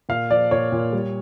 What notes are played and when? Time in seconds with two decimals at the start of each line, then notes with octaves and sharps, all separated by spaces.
0.09 A#2 F5
0.31 F3 D5
0.51 A#2 C#5
0.72 A#2
0.92 G3